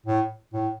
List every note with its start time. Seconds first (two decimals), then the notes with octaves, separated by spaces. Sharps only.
0.06 A2
0.54 A2